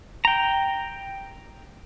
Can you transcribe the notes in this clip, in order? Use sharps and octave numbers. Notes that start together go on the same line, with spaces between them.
G5 A#5